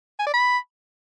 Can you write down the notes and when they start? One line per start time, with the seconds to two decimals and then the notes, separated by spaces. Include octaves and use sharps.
0.19 G#5
0.26 D5
0.34 B5